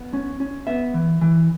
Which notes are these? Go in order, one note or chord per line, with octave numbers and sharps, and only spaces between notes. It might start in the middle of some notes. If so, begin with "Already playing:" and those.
Already playing: B3
C#4
C#4
B3 E5
E3
E3